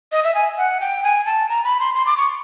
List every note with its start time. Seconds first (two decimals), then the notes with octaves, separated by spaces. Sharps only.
0.12 D#5
0.24 E5
0.35 G#5
0.58 F#5
0.80 G5
1.04 G#5
1.26 A5
1.49 A#5
1.64 B5
1.80 C6
1.95 C6
2.06 D6
2.17 C#6